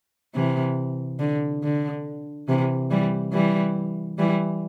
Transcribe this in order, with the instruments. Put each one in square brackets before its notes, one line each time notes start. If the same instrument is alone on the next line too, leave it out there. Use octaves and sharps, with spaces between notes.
[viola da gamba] C3 E3
D3
D3
C3 E3
E3 G3
E3 G3
E3 G3